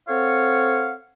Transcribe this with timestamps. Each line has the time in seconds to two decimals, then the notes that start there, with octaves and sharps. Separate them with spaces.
0.08 C4 A4 C#5 F5 F#5